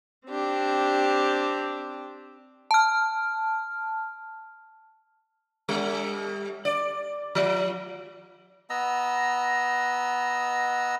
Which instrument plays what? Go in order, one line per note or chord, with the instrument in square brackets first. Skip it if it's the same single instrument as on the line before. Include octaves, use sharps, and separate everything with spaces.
[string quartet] C4 D4 G4
[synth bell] A5 F6
[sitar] G3
D5
F3
[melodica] B3 D#5 A#5 E6